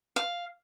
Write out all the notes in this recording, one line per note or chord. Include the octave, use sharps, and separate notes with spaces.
F5